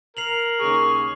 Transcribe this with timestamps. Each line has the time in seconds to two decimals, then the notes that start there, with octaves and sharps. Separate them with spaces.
0.17 A#4 C7 F7 F#7
0.60 D#2 C#3 G#4 C#6